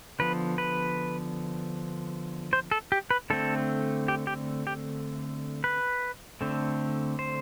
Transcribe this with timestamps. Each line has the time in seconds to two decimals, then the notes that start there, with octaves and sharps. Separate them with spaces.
0.19 D3 F3 B3 B4
0.58 B4
2.53 C5
2.71 A4
2.92 G4
3.11 B4
3.30 D3 A3 C4 A4
4.08 G4
4.27 G4
4.67 G4
5.64 B4
6.41 D3 A3 C4
7.19 C5